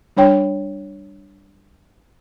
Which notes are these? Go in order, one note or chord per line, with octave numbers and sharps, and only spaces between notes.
G3 D4 C#5 G5